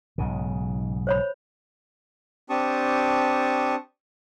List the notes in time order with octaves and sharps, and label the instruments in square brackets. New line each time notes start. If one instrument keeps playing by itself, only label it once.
[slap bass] B1 G#2 C#3
[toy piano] C5 C#5 B5
[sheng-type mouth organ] C4 D4 G4 A5 C#6 D#6